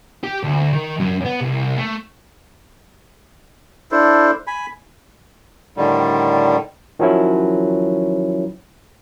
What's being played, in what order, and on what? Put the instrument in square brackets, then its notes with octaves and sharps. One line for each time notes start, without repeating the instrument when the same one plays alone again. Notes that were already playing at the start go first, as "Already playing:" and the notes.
[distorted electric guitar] G4
D2
D#3
F#2
B3
C2
A3
[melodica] D4 E4 A4 C5
G#5 B5
[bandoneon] A2 D3 D#3 G3
[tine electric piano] D#3 F3 F#3 C#4 E4